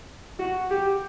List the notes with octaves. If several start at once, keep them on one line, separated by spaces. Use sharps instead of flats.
F#4
G4